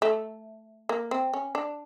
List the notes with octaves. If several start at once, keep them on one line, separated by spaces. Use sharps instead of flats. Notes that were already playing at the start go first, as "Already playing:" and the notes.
A3
A#3
C4
C#4
D4